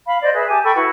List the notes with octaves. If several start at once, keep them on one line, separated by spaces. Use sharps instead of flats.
F5 B5
C5 D5 D#5
G#4 B4 E5
G4 G#5 A5
A4 G5 B5 C#6
E4 F#4 B4